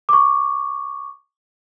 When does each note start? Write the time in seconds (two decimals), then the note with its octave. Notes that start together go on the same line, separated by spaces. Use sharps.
0.09 C#6 D6